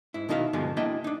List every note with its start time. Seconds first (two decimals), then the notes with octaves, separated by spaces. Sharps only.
0.14 G#2 E4
0.29 B2 D#3 D#4 E4 C#5 F5
0.53 G2 B2 D3 F3 G#3
0.77 A#3 D4 E4 D#5 G5
1.04 D4 D#4